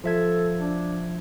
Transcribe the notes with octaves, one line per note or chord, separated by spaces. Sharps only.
F3 A4 E5 G#6
D4